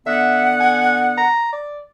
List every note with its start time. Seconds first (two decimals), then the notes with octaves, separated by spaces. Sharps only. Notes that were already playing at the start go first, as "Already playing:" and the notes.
0.06 D3 B3 E5 F#5
0.60 G#5
1.17 A#5
1.53 D5